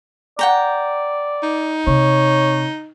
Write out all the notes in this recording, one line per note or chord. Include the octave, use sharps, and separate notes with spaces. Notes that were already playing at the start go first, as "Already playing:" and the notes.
D5 F#5 G5 A#5
D#4
C3 C#5